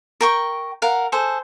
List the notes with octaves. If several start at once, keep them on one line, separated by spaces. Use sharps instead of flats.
A#4 G5 C#6
A#4 F5 F#5
G#4 A4 C5